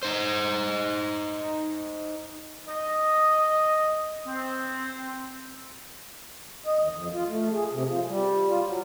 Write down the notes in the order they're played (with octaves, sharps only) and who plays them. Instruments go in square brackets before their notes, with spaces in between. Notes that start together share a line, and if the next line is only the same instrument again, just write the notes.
[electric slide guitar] D#4 C5
[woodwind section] D#5
C4
[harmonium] D#5
D#2
F2
F4
A3
G#4
C3
F3
G3
F4
F#3